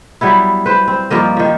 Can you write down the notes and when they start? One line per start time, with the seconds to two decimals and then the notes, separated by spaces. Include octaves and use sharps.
0.21 F#3 G3 B3 E4
0.66 B4 C5
0.88 C4
1.10 G2 F3 A#3 D#5
1.37 D#3 F3